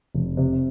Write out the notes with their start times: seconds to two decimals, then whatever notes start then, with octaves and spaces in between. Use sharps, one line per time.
0.15 F1
0.37 C3